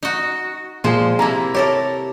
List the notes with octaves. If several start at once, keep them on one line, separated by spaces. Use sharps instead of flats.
D#4 F#4
A#2 F3 G#3 C5
C3 A#3 E4 A#5
G4 A4 A#4 C#5